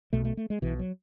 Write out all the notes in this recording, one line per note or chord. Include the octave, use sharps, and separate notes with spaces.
B1 B2 A3
A3
A3
G#3
B1 B2 E3
F#3